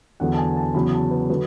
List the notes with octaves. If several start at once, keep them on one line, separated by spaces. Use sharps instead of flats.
E2 D3 F#3 F#5
A5
G#5
A5
E2 C#3 F#3 B5
A5
B4
D3 F#3 B4